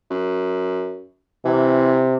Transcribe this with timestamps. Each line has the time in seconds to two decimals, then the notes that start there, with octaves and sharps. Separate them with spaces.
0.10 F#2
1.45 C3 E3